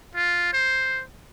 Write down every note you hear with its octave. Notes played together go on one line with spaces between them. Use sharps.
F4
C5